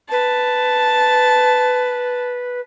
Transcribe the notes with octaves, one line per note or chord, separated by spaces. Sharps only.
B4 A5